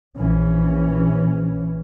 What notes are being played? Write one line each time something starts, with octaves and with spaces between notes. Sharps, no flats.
A#1 E3 C#4